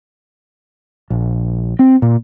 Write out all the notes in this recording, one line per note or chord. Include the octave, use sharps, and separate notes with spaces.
A#1
C4
A#2